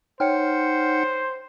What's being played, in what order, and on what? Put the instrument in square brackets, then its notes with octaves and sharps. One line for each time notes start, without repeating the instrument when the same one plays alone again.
[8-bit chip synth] D#4 F#5 C#7 [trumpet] C5 [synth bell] C#5 G5 F6